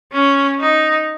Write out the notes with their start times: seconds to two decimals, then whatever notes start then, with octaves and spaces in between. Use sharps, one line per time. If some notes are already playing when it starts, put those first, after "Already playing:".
0.12 C#4
0.60 D#4